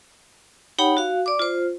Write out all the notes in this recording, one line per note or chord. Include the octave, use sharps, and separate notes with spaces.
D#4 G4 C#5 F#5 G5 B5
F#4 F5
D5 D6
F4 C5